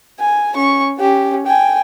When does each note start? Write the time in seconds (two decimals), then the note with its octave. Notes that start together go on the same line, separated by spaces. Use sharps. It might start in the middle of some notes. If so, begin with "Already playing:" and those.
0.20 G#5
0.55 C#4 C#6
0.99 C#4 G4
1.47 G5 G#5